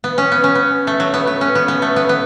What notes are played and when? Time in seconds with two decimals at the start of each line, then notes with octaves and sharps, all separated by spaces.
0.04 B3
0.18 C#4
0.32 B3
0.44 C#4
0.55 B3
0.87 A3
1.00 F#3
1.14 B3
1.27 B3
1.41 C#4
1.55 B3
1.68 B3
1.82 A3
1.96 B3
2.09 B3